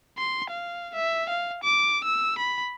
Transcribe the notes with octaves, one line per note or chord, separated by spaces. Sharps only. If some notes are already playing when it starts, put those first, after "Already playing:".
C6
F5
E5
F5
D6
E6
B5